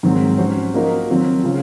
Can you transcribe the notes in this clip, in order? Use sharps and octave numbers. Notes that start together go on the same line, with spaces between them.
G#2 D#3 F#3 C4
F#3 C#4 F#4 C5
F3 A#3 D#4 F#4 A#4
D#3 F#3 C4 F4
C#3 G#3 C#4 F4